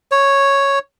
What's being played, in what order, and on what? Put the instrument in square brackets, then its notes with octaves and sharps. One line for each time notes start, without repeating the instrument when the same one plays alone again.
[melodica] C#5